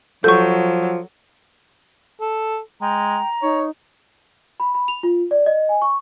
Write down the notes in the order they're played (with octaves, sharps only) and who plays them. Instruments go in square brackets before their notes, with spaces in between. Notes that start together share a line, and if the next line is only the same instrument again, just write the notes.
[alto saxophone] F3 [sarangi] F#3 [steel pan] A4 [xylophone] C#6 G6
[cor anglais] A4
[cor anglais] G#3 [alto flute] G5 [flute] A#5
[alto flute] D#4 [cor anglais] C#5
[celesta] B5
B5
F7
F4
D5
D#5
G#5
C#6